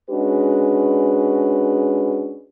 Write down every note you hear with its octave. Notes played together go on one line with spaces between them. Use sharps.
G#3 C#4 D4 F#4 B4